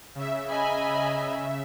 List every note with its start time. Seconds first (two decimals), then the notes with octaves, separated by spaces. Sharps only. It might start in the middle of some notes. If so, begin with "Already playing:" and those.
0.15 C#3 E5
0.50 D#5 G#5 A#5 B5